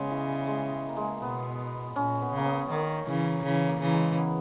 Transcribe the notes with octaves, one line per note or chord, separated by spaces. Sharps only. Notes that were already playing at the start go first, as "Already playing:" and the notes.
Already playing: C#3 G#3 B3 C#4
E3
G3
G#3
A#3
G#3
B2 B3
A#2 C#4
B3
C#3 A#3
B3
D#3 A#3
C#3 E3
C#3 E3
A#3
C#3 E3
G#3
B3